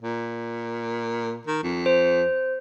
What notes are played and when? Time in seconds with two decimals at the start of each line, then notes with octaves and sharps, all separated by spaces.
0.02 A#2
1.47 D#3
1.63 F2
1.86 C5